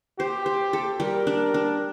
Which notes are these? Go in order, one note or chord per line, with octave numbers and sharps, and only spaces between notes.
G4 C5
C5
A4
G3 A#4
D4
D4